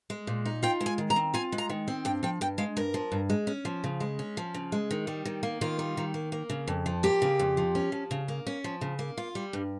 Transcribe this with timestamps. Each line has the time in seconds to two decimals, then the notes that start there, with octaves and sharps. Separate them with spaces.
0.10 G#3
0.27 A#2
0.45 D#4
0.63 F4 G5
0.81 G#3
0.86 G#5
0.98 D#3
1.10 A#5
1.16 C4
1.34 F4 G#5
1.52 G#3
1.58 A#5
1.70 D#3
1.88 C4
2.05 G2 G5
2.23 F3 G5
2.41 G2 G5
2.58 G#3 F5
2.77 G2 A#4
2.94 F3
3.12 G2
3.30 G#3
3.47 C#4
3.65 F3
3.84 C#3
4.00 G#3
4.19 C#4
4.37 F3
4.54 C#3
4.72 G#3
4.91 D#3
5.07 G3
5.25 D#3
5.43 A#3
5.61 D#3 F4
5.79 G3
5.97 D#3
6.14 A#3
6.32 A#3
6.50 C#3
6.68 F2
6.86 F3
7.03 A#3 G4
7.22 C#3
7.39 F2
7.57 F3
7.75 C#4
7.92 F3
8.11 C#3
8.28 A#3
8.47 C#4
8.64 F3
8.81 C#3
8.99 A#3
9.17 F4
9.35 G3
9.53 G2